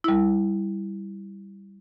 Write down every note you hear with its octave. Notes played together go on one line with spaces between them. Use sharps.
G3 E4